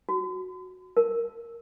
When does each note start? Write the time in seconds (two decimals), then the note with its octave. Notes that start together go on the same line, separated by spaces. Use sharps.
0.09 F#4
0.97 A#4